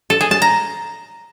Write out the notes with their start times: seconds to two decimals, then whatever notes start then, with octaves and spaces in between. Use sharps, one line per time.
0.10 A4
0.21 G#4
0.31 A5
0.42 A#5